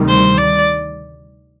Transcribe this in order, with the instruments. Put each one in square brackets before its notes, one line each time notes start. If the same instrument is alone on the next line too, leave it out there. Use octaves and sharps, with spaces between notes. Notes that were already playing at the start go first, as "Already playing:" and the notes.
Already playing: [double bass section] D2 C3 D#3 G3
[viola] C5
D5